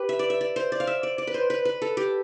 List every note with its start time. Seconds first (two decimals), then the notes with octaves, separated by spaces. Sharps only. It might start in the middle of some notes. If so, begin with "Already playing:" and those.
Already playing: G4 B4
0.09 E5
0.19 D5
0.30 E5
0.41 D5
0.56 C5
0.72 D5
0.80 F5
0.87 E5
1.03 D5
1.18 D5
1.27 B4
1.34 C5
1.50 B4
1.65 B4
1.82 A4
1.97 G4